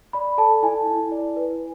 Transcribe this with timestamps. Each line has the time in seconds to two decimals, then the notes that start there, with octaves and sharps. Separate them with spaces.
0.13 D5 B5
0.38 A4 A5
0.63 E4 G#5
0.87 E4
1.12 D5
1.36 B4